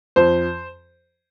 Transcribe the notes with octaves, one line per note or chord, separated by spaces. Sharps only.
F2 C5